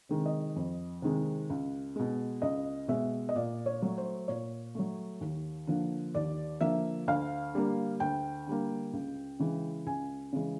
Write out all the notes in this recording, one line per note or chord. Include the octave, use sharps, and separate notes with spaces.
C3 D#3 G#3
D#5
F2
C3 D#3 G#3
C#2
B2 G#3
C#2 D#5
B2 G#3 E5
D#5
A#2 D5
C#5
F#3 A3
C5
A#2 C#5
F#3 A3
D#2
D3 F3 A#3
D#2 D5
D3 F3 A#3 E5
D2 F5
D3 G3 A#3
D2 G5
D3 G3 A#3
C#2
C#3 E3 G#3
C#2 G#5
C#3 E3 G#3